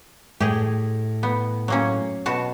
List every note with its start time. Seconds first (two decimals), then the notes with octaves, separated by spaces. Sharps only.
0.40 A2 G4 G#4
1.23 B3
1.68 F#3 A#3 C#4
2.26 B2 F#4 A5